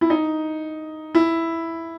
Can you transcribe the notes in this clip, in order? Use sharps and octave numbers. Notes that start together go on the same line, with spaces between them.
E4
D#4
E4